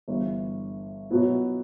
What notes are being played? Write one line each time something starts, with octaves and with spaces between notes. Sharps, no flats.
G1 G2 E3
B2 F#3 B3 E4